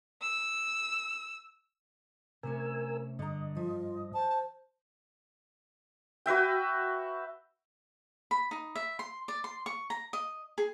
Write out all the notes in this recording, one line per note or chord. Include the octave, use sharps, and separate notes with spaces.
E6
C3 A3 C#4 A#4 G#5 E6
G2 D3 D#5 A#5
F3 F4
C5 A5
F#4 B4 E5 G5
B5
D#4
E5
C6
D5
C6
C#6
A#5
D#5
G#4